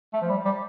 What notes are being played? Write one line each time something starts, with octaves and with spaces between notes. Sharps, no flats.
A3
F3
G3
G3